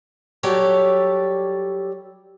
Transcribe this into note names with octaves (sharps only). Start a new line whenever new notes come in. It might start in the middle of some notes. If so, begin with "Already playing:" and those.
F#3 G3 G4 A4 C#5 D5